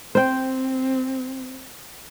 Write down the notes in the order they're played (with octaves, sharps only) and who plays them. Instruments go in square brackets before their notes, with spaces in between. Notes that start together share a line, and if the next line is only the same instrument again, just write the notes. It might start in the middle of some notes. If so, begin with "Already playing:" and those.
[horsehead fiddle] C4 [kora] C5 G5